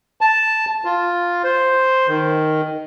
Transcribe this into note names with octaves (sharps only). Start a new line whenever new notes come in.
A5
F4
C5
D#3